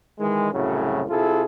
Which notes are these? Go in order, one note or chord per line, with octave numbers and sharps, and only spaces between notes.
D#3 E3 G#3
C2 F#2 A2 C#3 F#3
C3 E4 F4 G#4 A4